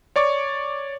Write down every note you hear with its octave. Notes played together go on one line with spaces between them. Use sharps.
C#5 D5 C#6 D6